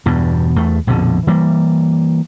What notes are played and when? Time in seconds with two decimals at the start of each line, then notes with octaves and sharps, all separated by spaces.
0.06 E2 G2 B2
0.56 E2 A3
0.87 A#1 F2 B2 D3
1.27 E3 G3 A#3